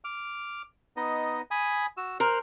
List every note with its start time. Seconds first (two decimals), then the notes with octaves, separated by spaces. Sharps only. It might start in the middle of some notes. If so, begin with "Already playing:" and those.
0.05 D6 F6
0.97 B3 D#4 D#5
1.51 G#5 B5 D#6
1.97 F#4 E6
2.20 A#4 C5 F6 F#6